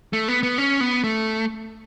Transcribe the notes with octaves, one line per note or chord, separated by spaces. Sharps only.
A3
B3
B3
C#4
B3
A3